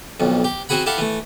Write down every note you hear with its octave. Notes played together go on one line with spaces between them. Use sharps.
B1 F2
G4
C4 F#4 G#4 F#5 B5
E4 G4 A4 F5 F#5
E3 A3